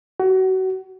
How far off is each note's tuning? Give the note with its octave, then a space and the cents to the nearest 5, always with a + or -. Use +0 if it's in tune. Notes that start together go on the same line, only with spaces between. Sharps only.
F#4 +30